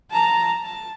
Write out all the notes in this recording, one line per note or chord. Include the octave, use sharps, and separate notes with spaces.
A5 A#5
A5